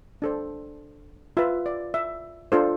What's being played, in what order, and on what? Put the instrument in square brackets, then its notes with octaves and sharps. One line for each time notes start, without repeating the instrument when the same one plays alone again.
[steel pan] D4 A4 C5
F4 B4 E5
D5
E5
D4 F4 A4 C5